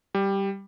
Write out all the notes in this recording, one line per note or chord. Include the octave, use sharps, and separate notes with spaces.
G3